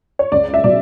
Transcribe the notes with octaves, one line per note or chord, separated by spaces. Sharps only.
C#5
C#2 D5
E5
B2 F#3 D5